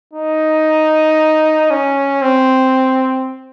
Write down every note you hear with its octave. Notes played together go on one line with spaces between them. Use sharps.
D#4
C#4
C4